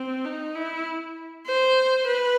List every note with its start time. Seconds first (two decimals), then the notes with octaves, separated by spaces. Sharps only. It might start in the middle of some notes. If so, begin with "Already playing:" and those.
Already playing: C4
0.25 D#4
0.56 E4
1.47 C5
2.07 B4